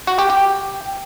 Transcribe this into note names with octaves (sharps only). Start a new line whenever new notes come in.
F#4
G4
G4